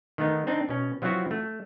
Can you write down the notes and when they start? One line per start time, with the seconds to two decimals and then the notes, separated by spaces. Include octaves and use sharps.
0.18 D#3 A3 B3 D#4
0.47 C4 D4 D#4
0.69 B2 C#4
1.02 F3 F#3 B3 C4 E4 F#4
1.31 A3